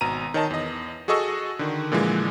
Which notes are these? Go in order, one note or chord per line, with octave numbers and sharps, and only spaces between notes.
G#1 B2 A#5 D#7
D#3 C#5 D#5 A5
E2 D#5
F#4 G#4 A4 D#5 C#6 E6
D3 D#3
A#2 D3 E3 F3 G#3